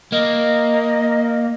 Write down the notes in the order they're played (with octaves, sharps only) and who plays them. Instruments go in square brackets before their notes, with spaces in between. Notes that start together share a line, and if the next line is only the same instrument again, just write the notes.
[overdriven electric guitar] A#3 [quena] D#5